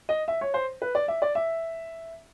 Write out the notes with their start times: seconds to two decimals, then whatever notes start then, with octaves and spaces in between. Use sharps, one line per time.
0.09 D#5
0.28 E5
0.41 C#5
0.54 C5
0.82 B4
0.95 D5
1.08 E5
1.22 D5
1.35 E5